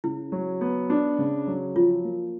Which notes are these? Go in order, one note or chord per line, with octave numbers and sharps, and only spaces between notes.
C#3 E4
F#3
B3
D4
C#3
F#3
F3 F4
A#3